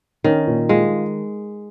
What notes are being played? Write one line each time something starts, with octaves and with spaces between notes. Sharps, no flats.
D#3 C#4
A#2
G#3 F4